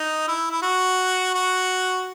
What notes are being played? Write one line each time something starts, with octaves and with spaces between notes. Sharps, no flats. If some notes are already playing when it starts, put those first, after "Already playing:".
Already playing: D#4
E4
E4
F#4
F#4